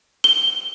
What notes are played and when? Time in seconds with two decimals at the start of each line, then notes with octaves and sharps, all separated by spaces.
0.24 G7